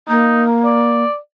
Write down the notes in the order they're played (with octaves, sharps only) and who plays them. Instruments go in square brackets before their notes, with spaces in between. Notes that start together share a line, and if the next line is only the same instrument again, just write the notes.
[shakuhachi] A#3 [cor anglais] D#4
[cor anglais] D5